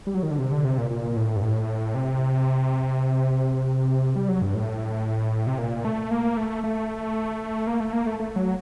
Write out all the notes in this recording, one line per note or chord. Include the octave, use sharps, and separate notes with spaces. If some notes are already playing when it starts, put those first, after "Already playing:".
G3
F#3
D#3
D3
C3
D3
C3
A#2
A#2
A2
G2
A2
C3
G3
F#3
G2
A2
C3
A#2
A3
A#3
A3
A3
A#3
A3
A#3
A3
A3
F#3